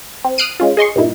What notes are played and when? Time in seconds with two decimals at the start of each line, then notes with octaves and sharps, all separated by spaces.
0.25 C4
0.38 D#6 F6 F#6 C7 D7 D#7
0.60 G#3 C#4 F4
0.77 G#4 D#5 C6 C#6
0.96 G2 A#2 D#4 E4